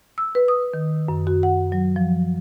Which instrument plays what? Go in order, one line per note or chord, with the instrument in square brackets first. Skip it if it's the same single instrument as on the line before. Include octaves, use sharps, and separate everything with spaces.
[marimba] E6
B4
D#6
D#3
F#2
F#4
F#5
F#3
F3